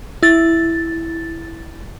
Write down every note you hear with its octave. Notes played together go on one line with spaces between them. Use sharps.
E4 A6